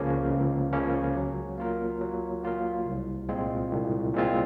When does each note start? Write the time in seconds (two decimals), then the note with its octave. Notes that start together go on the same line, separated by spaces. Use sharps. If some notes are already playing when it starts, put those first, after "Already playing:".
Already playing: C#2 C#3 F3 A#3 C#4
0.30 C#2
0.72 C#3 F3 A#3 C#4
1.16 F#3
1.58 A#3 F4 A#4
2.01 F#3
2.44 A#3 F4 A#4
2.86 C2
3.29 A#2 G#3 C4 F4
3.72 C2
4.14 A#2 G#3 C4 F4